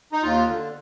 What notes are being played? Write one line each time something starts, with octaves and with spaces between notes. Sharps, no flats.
D#4
D#2 F4
D3